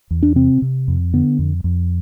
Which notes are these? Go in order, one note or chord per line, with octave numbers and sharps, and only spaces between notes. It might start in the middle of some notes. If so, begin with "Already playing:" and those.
E2
D4
C3 C4
C3
F2
D3 B3
F2
F2